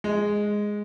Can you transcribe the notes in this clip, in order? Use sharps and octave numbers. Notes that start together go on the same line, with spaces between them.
G#3